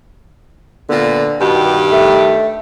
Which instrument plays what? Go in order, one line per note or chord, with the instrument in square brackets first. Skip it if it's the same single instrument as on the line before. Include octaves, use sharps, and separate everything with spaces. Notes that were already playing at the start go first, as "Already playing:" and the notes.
[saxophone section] A#2 B3 [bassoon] D3
[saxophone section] G2 D#3 G4 [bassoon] B2
[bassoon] A3